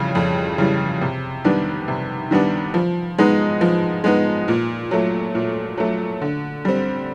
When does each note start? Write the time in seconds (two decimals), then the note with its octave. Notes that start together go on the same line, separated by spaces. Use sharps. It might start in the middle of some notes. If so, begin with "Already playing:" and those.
Already playing: F2 C#3 E3 G3
0.15 F2
0.58 C#3 E3 G3
1.01 C3
1.44 D#3 G3 B3 D4
1.88 C3
2.31 D#3 G3 B3 D4
2.74 F3
3.18 G#3 B3 D#4
3.61 F3
4.04 G#3 B3 D#4
4.48 A#2
4.91 F#3 A3
5.35 A#2
5.78 F#3 A3
6.22 D3
6.65 G3 C4